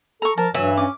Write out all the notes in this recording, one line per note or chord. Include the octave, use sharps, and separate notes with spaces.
A4 A#5 C#6
F3 A#4 A5
G2 E3 F#3 E5
C#4 D6